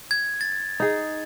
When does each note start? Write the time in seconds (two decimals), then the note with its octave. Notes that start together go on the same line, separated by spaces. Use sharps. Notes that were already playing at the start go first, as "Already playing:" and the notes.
0.11 G#6
0.41 A6
0.80 D#4 G#4